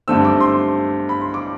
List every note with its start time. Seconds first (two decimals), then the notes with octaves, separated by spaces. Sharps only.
0.08 G2 D3 A3 C4 E6
0.25 D6
0.40 C6
1.09 B5
1.21 C6
1.34 D6